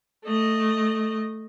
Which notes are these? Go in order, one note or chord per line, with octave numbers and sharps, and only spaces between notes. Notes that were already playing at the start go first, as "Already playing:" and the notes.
A3 D#5